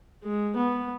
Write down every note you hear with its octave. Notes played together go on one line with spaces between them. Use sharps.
G#3
B3